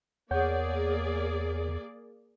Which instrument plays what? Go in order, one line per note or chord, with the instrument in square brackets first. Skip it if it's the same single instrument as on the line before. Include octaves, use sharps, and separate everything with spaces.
[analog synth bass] E2 [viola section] A#3 G#4 D5 [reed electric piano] C#5 F#5 G6